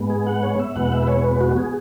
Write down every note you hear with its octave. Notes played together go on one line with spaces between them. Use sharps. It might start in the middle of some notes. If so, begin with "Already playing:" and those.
Already playing: G#2 G#3 B3
G#4
F#5
C#5
E5
E2 B2 G#3 B3 F#5
E5
B4
C#5
B4
F#4
G#4